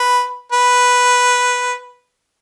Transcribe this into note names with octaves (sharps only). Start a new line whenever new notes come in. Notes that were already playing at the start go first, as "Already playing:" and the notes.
Already playing: B4
B4